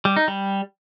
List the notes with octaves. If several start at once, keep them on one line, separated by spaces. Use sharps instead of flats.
G3
D#4
G3